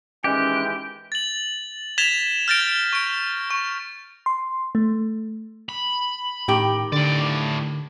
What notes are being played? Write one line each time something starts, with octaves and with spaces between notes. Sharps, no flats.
D#3 E3 G#3 C#4 G4 F#6
A6 F#7
G#6 A6 B6 E7 F7 G7
F6 G6 A6 A#6 D7
C#6 D7
C#6
C6
A3
B5
A2 D#3 G4
A2 D3 D5